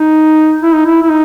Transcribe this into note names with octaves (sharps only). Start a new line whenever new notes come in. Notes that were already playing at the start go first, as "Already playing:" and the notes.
Already playing: D#4
E4
D#4
E4
E4
D#4